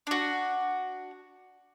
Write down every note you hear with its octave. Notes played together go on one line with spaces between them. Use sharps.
D4 F#4